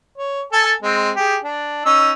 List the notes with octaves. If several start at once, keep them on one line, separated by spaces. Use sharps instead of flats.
C#5
A4 G#5 A5
G#3 C4
G4 G#4
D4
C#4 D#4 E6